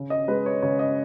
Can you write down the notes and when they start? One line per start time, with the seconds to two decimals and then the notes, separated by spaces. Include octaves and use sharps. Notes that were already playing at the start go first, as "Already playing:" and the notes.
Already playing: C#3
0.10 D#5
0.28 G#3 B4
0.46 C#5
0.62 C#3 C#5
0.79 D#5